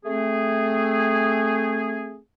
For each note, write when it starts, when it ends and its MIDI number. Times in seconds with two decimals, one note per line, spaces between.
0.05 2.17 57
0.05 2.17 60
0.05 2.17 68